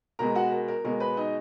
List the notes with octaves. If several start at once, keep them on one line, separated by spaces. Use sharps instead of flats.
B2 G#3 A#4 A#5
F#4 F#5
A#4
A#4
B2 G#3 A#4
B4
D#4 D#5